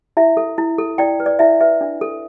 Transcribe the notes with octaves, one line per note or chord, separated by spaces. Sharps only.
E4 E5
A4
E4
A4
E4 D5 G5
B4
D5
E4 E5
B4 E5
D4
A4